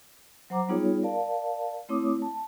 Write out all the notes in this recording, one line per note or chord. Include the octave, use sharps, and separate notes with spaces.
F#3 C5 F#5 A#5 D6
G3 B3 D#4 F4 G#4 C#5
A#4 D5 F5 A5
A3 C4 E4 C#5 D6 D#6
A5